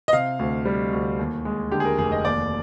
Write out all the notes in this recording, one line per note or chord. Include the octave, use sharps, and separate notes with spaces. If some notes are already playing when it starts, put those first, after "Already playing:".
D#5
C3 F5
D2
G3
D2
D#2
G#3
D3 G4
G#4
A#4
F1 G#4
D#5
D#2 D5